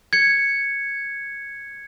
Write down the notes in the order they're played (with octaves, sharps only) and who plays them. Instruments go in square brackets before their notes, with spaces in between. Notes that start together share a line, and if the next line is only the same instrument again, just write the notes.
[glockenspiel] G#6 C#7